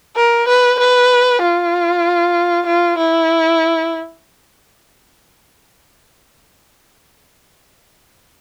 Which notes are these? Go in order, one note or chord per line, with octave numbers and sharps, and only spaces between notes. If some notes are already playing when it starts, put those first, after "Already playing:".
A#4
B4
B4
F4
F4
E4